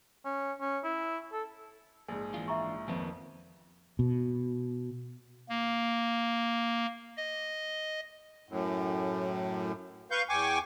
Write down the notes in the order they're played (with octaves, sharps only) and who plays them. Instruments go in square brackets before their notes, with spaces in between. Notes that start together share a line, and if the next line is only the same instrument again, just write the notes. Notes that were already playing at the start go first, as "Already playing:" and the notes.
[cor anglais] C#4
C#4
E4
A4
[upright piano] A#1 G#2 [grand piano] G#4
[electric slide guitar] E3 D4 F4
[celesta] E5 A#5 C#6
[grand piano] F2 [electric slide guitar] D#3 A#3 B3
[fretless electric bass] B2
[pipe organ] A#3
D#5
[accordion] F#2 A2
B4 F5 C#6 G6
E2 G5 G#5 C#6 D6